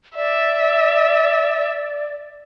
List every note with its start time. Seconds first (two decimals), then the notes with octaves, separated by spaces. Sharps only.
0.16 D5 E5